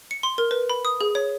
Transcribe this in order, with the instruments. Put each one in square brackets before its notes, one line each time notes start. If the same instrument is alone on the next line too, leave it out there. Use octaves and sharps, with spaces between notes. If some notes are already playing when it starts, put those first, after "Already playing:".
[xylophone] C#7
C6
A#4
B4
B5
D#6
G#4
C#5